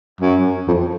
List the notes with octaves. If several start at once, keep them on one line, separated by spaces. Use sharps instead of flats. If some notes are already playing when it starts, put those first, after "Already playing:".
F#2
F2